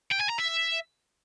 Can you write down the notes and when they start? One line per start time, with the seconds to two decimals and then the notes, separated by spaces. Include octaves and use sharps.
0.11 G5
0.20 G#5
0.29 A#5
0.38 E5